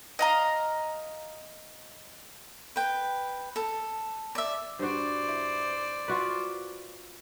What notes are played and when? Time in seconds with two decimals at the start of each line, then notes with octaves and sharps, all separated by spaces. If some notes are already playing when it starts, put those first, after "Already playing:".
0.19 D#5 F5 A#5
2.76 B4 G5
3.56 A4
4.35 D5 E5
4.79 G2 F#4 C5 D5
5.28 E4
6.08 F4 F#4 B4